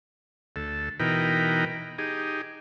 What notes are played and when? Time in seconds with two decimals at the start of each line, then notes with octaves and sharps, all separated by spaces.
0.56 D2 A4
1.00 B2 E3 D#4 A#4 G5 B5
1.98 D#4 G4 G#4